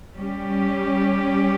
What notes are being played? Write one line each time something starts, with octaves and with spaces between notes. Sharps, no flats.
G3 C#4 G4